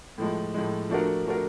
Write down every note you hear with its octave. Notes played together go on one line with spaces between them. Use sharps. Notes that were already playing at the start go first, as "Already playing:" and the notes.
A2 F3 G#3
A2 F3 G#3
F3 A3 D4 F#4 A#4
F3 A3 D4 F#4 A#4